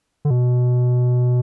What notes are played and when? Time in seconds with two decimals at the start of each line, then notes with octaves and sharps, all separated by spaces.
0.25 D3
0.30 B2